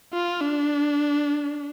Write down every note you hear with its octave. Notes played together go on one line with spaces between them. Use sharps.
F4
D4